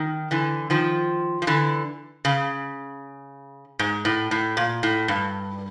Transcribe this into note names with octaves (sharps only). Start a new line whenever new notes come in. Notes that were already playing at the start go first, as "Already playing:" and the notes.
Already playing: D#3
D3 E3
D#3 F3
F3
D3 E3
C#3
G#2
A2
A2
A#2
A2
G2